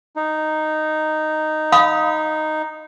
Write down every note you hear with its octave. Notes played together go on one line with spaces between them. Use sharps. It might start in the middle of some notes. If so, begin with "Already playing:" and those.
D#4
F5 B5 D#6